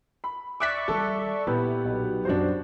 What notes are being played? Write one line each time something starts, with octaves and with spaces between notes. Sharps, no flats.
B5
D5 E5 C#6 D6 F#6 B6
D#3 G3 A4
A#2 B3 E4 G4 B4
B1
F#2 D4 E4 F#4 C5